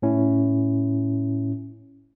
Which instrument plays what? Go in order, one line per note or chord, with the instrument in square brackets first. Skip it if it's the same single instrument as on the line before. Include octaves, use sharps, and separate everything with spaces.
[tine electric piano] A2 C#4 E4